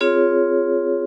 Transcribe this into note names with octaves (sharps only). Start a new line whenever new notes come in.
C4 F4 G#4 C#5